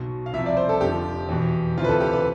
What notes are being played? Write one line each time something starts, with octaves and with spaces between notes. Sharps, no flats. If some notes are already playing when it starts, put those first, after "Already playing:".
Already playing: B1 B2
F5
C2 C3 F3 E5
D5
C5
A4
F1 F2 D3 F3 G4
E2 B2
D2 C3 E3 F4
B4
A4
G4
B4